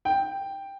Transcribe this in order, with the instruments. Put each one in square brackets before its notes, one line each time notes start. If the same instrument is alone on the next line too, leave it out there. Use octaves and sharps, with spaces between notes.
[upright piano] G5